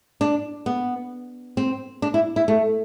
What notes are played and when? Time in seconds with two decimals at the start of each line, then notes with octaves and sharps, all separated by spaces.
0.21 D4
0.66 B3
1.57 C4
2.02 D4
2.14 E4
2.36 E4
2.48 A3